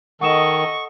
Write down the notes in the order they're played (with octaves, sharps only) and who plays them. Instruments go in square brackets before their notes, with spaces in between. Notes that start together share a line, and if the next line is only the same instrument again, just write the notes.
[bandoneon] D#3 [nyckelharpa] A4 D#5 [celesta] F#5 D#6 E7 [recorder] C#6